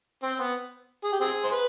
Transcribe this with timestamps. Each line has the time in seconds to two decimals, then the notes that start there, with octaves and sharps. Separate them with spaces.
0.23 C4
0.39 B3
1.04 G#4
1.12 G4
1.21 C4 G#4
1.44 C5
1.52 B4